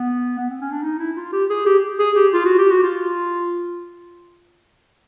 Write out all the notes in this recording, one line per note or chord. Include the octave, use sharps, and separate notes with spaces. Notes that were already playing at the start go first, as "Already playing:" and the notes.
Already playing: B3
B3
C4
C#4
D4
D#4
E4
F4
G4
G#4
G4
G#4
G4
F4
F#4
G4
F#4
F4